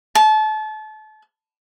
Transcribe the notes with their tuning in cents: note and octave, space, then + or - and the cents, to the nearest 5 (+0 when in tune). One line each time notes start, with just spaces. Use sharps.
A5 -30